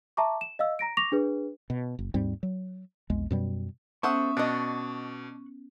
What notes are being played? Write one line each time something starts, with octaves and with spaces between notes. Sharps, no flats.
E5 A5 A#5 C#6 D6
E7
D#5 F5 E6
A#5 A#6 D7
C#6 D6 A#6 F7
D4 G#4 B4
B2
F#1
D#2 G#2 G3 C4
F#3
A#1 E2 G#3
F#2 B2 G3
B3 C#4 A4 C5 E5 F#5 C#6 D#6
B2 D4 D#5 C#6 F#6